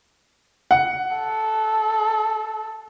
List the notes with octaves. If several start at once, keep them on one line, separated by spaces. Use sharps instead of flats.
F#5
A4